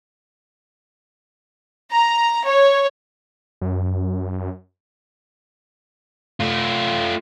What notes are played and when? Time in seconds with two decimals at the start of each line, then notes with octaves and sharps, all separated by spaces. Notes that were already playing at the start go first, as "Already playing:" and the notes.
1.92 A#5
2.46 C#5
3.61 F#2
6.40 A3 F4